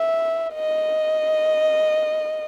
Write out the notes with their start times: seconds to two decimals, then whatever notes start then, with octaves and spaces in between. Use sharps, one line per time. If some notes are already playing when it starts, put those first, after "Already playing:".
Already playing: E5
0.55 D#5